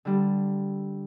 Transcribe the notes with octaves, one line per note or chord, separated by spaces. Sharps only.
D3 G3